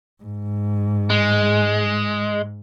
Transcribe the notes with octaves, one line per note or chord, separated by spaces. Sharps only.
G#2
G#3